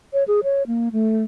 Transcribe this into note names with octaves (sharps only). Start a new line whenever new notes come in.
C#5
G#4
C#5
A#3
A3